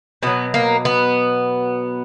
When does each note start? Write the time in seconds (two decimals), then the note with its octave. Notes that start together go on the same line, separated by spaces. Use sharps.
0.23 B2 F#3 B3
0.54 A#3
0.85 B3